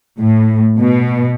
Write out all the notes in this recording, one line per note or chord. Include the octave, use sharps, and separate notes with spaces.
A2
B2